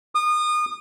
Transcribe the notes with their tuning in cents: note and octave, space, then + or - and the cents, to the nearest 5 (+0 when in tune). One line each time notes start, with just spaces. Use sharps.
D#6 -30